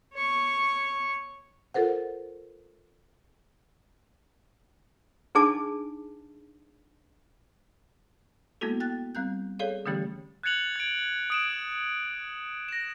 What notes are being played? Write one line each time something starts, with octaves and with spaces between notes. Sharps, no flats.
C#5 C#6
F4 A4 A#4 C5 F#5
D4 D#4 G#4 G#5 A5 D6
G#3 A#3 B3 E4 F#4 A4
G5 F#6 A6
G3 C4 F#6 G6
G#4 A4 C#5 D5 F5
D3 E3 G3 A3 C#4 G4
F#6 G#6 A6 C#7 F7 F#7
G#6 D7
D#6 D7 E7
A#6 E7